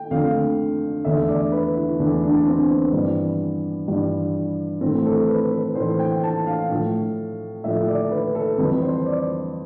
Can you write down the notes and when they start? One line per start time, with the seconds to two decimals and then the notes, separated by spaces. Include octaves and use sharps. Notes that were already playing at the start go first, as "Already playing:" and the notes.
Already playing: A3 G5
0.11 F2 D3 F3 A3 F5
1.05 E2 D3 A3 E5
1.28 D5
1.52 B4
1.76 E4
1.99 E2 D3 A3 D4
2.23 D4
2.47 C4
2.69 B3
2.93 G2 E3 G3
3.87 G2 E3 G3
4.81 A2 E3 A3 C4
5.06 A4
5.29 B4
5.52 B4
5.75 A2 E3 A3 C5
5.99 G5
6.24 A5
6.46 F5
6.69 A2 F3 A3
7.64 A2 F3 A3 E5
7.88 D5
8.11 B4
8.35 A4
8.58 F2 E3 G3 B4
8.82 C5
9.06 D5